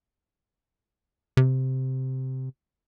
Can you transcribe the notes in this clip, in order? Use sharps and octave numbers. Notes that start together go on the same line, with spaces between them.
C3